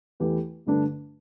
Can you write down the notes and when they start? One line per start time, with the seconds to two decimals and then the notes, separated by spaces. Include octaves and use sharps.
0.20 E2 E3 A3 G4 B4
0.66 G2 D3 A3 D4 B4